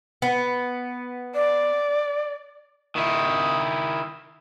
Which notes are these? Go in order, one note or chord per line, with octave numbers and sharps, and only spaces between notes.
B3
D5
D#3 E4